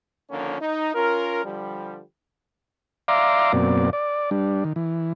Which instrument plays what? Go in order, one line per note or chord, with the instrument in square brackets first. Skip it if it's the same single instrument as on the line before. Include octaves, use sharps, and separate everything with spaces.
[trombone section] D3 D#3 F3 A#3 C#4
D#4
C#4 F4 A#4
D3 F3 G3
[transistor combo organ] D5 E5 F5 A#5 C6 D6
F#2 B2 A#3 C4 D5
D5
G3 D4
D#3
E3